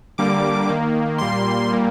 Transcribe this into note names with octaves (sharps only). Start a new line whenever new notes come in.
D3 G3 A#3 D6
D#3 A#3
A#2 G3 A#3 C6
A#2 G3 A#3